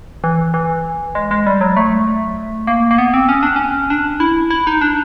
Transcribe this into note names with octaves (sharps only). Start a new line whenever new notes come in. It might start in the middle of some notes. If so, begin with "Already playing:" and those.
E3
E3
G#3
G#3
G3
F#3
A3
A#3
A#3
B3
C4
C#4
D4
C#4
D4
E4
E4
D#4
D4